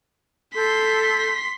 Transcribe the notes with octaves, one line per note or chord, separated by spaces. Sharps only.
A4 C6 G6 B6